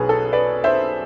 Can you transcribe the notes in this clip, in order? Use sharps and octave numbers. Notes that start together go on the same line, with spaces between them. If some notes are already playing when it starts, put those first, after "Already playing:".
Already playing: B1 B2 B3 G#4 B4
A4
B4 D5
C5 E5